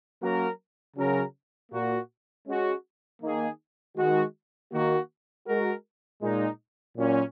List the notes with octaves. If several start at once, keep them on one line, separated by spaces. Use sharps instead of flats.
F#3 A#3 C#4 F#4 A#4
C#3 F#3 C#4 A#4
A#2 A#3 F#4
G#3 C#4 F#4
D#3 A#3 D#4 G#4
D#3 G#3 F#4
D#3 A#3 F#4
G#3 F#4 A#4
A#2 G#3 D#4
A#2 F#3 C#4